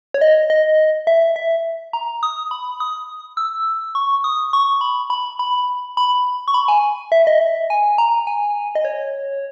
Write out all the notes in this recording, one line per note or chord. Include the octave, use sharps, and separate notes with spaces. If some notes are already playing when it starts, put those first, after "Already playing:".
C#5
D#5
D#5
E5
E5
A#5
D#6
B5
D#6
E6
C#6
D#6
C#6
B5
B5
B5
B5
C#6
B5
G#5
E5
D#5
E5
G#5
A#5
G#5
D#5
C#5